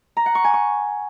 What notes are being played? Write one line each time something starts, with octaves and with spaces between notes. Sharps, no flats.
A#5
F#5
C#6
G#5
C#6